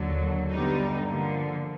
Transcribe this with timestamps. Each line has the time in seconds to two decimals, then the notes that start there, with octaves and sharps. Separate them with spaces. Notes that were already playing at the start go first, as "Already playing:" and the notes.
Already playing: D#2 D3 F#3
0.50 G2 D3 G3 B3 D#4
1.08 D3 F3 A#3